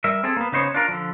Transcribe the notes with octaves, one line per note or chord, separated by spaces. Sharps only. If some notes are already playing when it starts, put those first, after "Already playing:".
G3 A#4 E5
C4 G#4 A4
A#3 B3
C#3 B3 D#4 C5 C#5
D4 F4 A#4
D3 F3